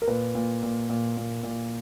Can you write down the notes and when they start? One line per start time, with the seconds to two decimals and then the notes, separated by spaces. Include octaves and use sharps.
0.02 A#4
0.08 A#2 B4
0.35 A#2
0.63 A#2
0.89 A#2
1.17 A#2
1.43 A#2